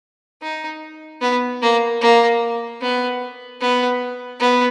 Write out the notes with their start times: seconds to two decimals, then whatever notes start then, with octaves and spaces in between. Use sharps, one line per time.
0.42 D#4
1.21 B3
1.62 A#3
2.01 A#3
2.81 B3
3.61 B3
4.40 B3